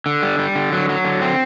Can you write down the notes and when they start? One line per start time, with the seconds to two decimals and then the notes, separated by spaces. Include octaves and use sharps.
0.06 D3
0.23 G3
0.39 G3
0.55 D3
0.73 F#3
0.89 F#3
1.05 D3
1.21 C4